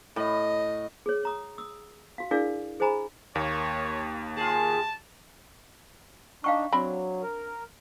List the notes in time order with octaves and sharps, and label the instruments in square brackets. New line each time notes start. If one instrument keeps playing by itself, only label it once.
[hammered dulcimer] A2 [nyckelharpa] D#5
[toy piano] G#4 C#5
C#5 A#5 D#6
D#6 E6
F#4 F5
D4 E4 G#4 A#4 D5 F5
G#4 C5 D#5 G#5 A#5 B5
[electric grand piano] D#2 A#3 [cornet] C#5
[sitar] F4 G#4 [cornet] A5
[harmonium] D4 D#4 [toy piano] F5 G5 C#6
[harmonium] F#3 [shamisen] C4 D4 B5
[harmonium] A#4